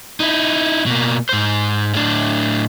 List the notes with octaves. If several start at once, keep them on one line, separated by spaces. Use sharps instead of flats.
D#4 E4
B2 A#3
G#2 C5
A2 D4